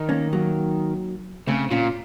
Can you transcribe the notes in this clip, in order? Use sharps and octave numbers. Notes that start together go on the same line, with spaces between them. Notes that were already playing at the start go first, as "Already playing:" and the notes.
Already playing: D#3
A#3 C#4
F#3 A#3
C#3 A3 C4
A#2 C#4 F4